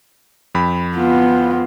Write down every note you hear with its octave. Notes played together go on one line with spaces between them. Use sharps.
F2 B5
B3 F4